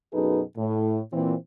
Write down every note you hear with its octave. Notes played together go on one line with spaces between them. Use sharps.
F#2 B2 D#4 G#4 A4 B4
A2
A#2 E3 C4